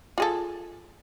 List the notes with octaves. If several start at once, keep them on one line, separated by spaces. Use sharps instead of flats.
F4 G#4 A4